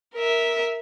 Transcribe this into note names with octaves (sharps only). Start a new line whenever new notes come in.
A#4 E5